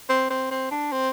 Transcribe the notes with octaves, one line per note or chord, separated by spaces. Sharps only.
C4
C4
C4
D4
C4